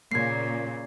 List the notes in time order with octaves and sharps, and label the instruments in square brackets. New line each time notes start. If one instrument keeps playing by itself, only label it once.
[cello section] A#2 C#3 A#3 [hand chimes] G#6 C7